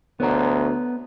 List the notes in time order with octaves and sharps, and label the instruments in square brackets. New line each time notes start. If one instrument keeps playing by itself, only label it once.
[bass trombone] D2 [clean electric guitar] B3 C#5 A#5